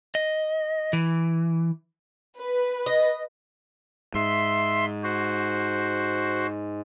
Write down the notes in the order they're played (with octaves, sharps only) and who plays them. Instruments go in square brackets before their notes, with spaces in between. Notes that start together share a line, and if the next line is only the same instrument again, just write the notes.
[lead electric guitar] D#5
E3
[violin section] B4
[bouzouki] D#5
[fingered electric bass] G#2 [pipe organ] E5 C6
[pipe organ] F#4 C5